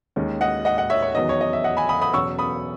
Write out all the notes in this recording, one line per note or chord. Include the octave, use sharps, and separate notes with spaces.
D#2 D#3 G#3 C#4
D#5 F#5
D#5 F#5
D#5 F#5
C#5 E5
C#5
E2 D#3 F#3 B3 D#5
C#5
D#5
E5
D#5 F#5
G#5 B5
B5 D#6
B5 D#6
E2 B2 F#3 C#4 C#6 E6
B5 D#6